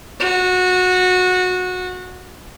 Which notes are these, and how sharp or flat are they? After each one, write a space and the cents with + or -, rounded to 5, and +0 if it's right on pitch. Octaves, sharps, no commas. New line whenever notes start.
F#4 -20